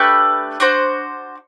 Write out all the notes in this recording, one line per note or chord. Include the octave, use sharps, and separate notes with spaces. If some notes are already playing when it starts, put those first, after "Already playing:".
Already playing: A3 D4 G4 B4
D4 F#4 C5